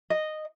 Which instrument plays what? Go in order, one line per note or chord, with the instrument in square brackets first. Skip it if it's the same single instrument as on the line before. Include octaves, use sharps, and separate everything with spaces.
[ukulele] D#5